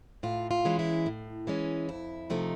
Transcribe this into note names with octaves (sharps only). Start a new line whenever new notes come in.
A2 F4
F4
E3 G#3 C#4
E4
A2
E3 G#3 C#4
F2 E4
C3 F3 A3 D#4